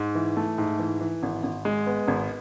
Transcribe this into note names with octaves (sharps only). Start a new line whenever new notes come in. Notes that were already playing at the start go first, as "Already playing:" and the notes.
Already playing: G#2
E3
A3
G#2
E3
E3
G#1
G#1
G#3
B3
G#1